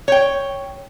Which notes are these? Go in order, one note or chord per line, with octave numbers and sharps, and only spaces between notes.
C#5 G5